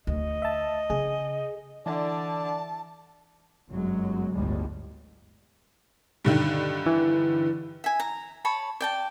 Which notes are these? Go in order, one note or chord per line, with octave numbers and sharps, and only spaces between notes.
D2 D#5
E5 A5
C#3 G#4
D3 E3 D5 A5
G1 F#2 F#3 G#3
G1 D2 A2 G3 G#3
G2 D3 D#3
E3
E5 G#5
A#5
C#5 A5 B5
D5 G5 A5